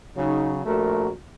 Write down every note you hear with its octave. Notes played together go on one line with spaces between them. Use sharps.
C#3 F#3 D#4
A#1 A3 F#4 A#4